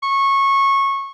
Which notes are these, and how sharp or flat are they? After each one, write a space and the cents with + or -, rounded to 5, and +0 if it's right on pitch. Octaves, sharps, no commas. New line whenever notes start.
C#6 -15